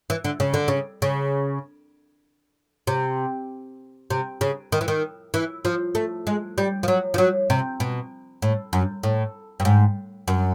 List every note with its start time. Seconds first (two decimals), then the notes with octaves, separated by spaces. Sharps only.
0.10 E3
0.24 D3
0.40 C#3
0.54 D3
0.68 C#3
1.02 C#3
2.87 C3
4.10 C3
4.41 C#3
4.72 D#3
4.81 E3
4.88 D#3
5.34 E3
5.65 F3
5.95 A3
6.27 G#3
6.58 G3
6.83 F3
6.88 F#3
7.14 F3
7.18 F#3
7.50 C3
7.80 B2
8.42 A2
8.73 F#2
9.03 A2
9.60 G2
9.65 G#2
10.28 F#2